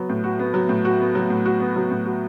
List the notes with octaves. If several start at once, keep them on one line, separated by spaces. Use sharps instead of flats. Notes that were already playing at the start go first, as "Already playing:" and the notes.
Already playing: F#3 B3
A2
F#4
B3
F#3
A2
F#4
B3
F#3
A2
F#4
B3
F#3
A2
F#4